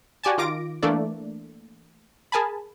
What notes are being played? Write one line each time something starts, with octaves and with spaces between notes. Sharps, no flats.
F#4 G4 D5 G#5 A5
D#3 F4 D6 A#6 D7
E3 A3 A#3 D4 A4 D5
G#4 A#4 G#5 A5 B5